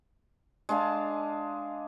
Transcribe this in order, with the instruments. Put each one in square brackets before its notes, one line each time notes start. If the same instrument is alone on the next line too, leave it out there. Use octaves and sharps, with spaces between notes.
[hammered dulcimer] G#3 D4 F5 A5